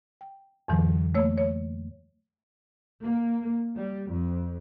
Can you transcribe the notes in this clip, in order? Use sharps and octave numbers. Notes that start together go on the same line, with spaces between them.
G5
F2 A2 D3 E3 F#3
A3 A#3 C#5 E6
C#5
A#3
G3
F2